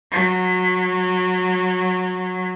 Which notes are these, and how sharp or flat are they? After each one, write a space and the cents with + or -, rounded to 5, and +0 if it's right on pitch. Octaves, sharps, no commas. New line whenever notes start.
F#3 -20